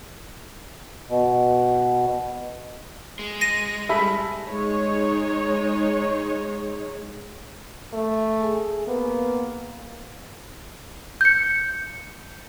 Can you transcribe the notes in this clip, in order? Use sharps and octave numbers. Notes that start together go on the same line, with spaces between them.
B2
G#3
A#6 D#7
G3 G#4 A4 E5 B5
G#3 D#4 C#5
A3
G#4
A#3 B3
G6 C#7